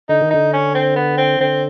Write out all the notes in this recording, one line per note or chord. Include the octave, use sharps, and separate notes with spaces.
D3 D#4
D#3
D3 D#4
C#4
C4
B3
C4
D3 C4